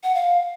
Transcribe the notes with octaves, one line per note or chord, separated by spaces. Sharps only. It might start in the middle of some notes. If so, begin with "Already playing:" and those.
F#5
F5